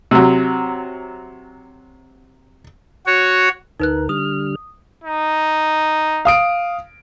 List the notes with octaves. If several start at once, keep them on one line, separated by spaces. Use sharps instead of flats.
C3 F#3
F#4 C#5
D2 D#4 A#4 B4 F#6
D3 G3 D#6 F6
D#4
F5 D#6 D7